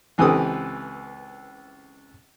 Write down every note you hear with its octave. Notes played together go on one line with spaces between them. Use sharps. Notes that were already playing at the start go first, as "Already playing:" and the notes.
C#2 E3 C4 G4 A4 D#6